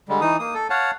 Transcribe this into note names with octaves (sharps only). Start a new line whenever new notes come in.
D3 G3 G#3
E3 D#4 D#6
A#3 D#6
A4
C#5 F5 F#5 A5